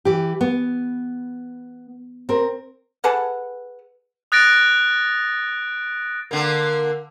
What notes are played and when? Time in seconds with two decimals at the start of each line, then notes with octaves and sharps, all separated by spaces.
0.05 E3 G4
0.41 B3
2.29 C4 A#4
3.04 G#4 A4 B4 F#5
4.32 D#6 F#6 A6 A#6 D7
6.31 D3 A#3